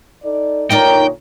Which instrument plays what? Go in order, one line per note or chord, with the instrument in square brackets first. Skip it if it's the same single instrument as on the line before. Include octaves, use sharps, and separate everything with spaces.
[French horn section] D#4 A4 D5
[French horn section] A#2 D3 C#5 [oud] D#4 A#4 D5 [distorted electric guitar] G5